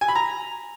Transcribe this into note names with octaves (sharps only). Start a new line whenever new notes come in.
G#5
B5
A#5